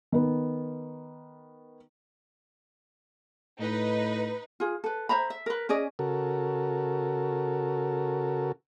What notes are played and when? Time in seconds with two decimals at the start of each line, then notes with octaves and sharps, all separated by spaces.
0.12 D#3 B3
3.60 A2 D#4 B4
4.60 F4 G#4
4.84 A4 B4
5.09 C5 E5 A#5 B5
5.30 E5
5.46 A#4 B4
5.69 C#4 G#4 D5 D#5
5.99 C#3 F#4 A4 A#4